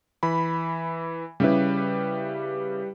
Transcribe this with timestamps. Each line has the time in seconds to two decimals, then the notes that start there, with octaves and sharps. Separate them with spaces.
0.23 E3 B5
1.40 C#3 G3 C#4 E4 G4 B4